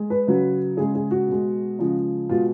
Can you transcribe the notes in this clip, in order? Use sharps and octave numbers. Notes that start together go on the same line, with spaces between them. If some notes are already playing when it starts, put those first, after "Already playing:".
Already playing: G#3
B4
C#3 F#3
C#3 G#3 G#4
G#4
F#4
B2 G#3
C#3 F3 G#3
B2 G#3 F4